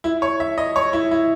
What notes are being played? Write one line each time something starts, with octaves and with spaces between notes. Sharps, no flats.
E4
C#5
E5
D#5
C#5
E4
E4